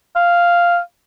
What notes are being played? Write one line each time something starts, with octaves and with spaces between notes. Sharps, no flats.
F5